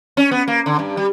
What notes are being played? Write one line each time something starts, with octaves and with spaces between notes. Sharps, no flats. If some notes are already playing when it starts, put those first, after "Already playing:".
C#4
B3
A#3
D3
G2
G3